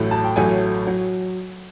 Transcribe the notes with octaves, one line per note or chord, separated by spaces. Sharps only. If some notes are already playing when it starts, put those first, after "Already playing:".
Already playing: A1 A2 F#3 A3
A5
G5
A1 A2 F#3 A3 G#5
F#3